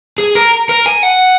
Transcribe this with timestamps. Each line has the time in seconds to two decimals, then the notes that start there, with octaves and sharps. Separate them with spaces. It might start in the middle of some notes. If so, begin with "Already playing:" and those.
0.18 G#4
0.35 A#4
0.69 A#4
0.86 G#5
1.03 F#5